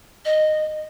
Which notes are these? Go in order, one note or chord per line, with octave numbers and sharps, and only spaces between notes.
D#5